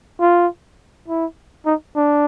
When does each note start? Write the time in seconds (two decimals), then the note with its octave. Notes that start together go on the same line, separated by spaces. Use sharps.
0.21 F4
1.08 E4
1.66 D#4
1.96 D4